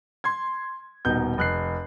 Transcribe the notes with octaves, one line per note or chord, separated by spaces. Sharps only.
C6 G#6
D#1 B2 D#4 G6
F1 F#6 C7